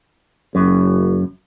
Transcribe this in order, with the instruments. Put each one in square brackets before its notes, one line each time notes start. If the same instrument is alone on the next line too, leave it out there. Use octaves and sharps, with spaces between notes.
[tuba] F#1 [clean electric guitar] F#2